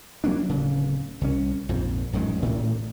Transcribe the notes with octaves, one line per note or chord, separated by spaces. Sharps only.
F#3 A#3 C#4 D4
D1 C#3
C2 C#4
A#1 F2 G#2
A1 F#2 D#3 G#3
A1 D2 A2 A3